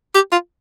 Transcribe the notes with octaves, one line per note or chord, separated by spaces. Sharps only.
G4
F4